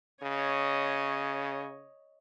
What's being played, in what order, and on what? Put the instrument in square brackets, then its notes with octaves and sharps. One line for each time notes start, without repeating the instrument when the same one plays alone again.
[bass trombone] C#3 [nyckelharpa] C#5 D#5